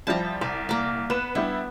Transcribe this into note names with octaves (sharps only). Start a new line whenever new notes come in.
F3 G3 E4 A5 A#5
C2 D5
A#3 D5
B3 B4 E7
G3 B3 D4 E4